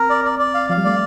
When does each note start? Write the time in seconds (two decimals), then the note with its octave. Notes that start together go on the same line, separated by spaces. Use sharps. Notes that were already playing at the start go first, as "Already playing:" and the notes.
Already playing: C4 A#4
0.10 D5
0.25 D5
0.39 D5
0.54 F5
0.69 F3 F5
0.77 G3
0.85 A3 D5